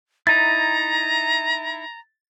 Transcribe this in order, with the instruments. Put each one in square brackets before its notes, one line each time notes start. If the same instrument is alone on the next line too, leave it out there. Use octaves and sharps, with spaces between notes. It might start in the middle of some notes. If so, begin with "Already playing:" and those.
[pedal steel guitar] D#4 E4 [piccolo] A#5 [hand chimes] A6